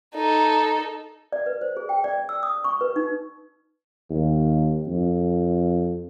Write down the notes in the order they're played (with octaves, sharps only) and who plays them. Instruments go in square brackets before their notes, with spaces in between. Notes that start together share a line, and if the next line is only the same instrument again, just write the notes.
[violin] D#4 A4
[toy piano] D5
B4
C5
G#4
G5
D5
E6
D#6
C#6
B4
D#4
[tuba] D#2
F2